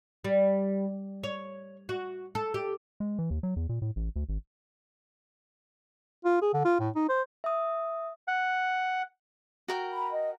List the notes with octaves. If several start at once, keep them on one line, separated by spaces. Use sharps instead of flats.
G3
C#5
F#4
A4
G4
G#3
E3
D#2
F#3
E2
A#2
A2
A1
D2
G#1
F4
G#4
D3
F4
A2
D#4
C5
E5 D#6
F#5
F#4 A#4 G5
A#5 B5
D#5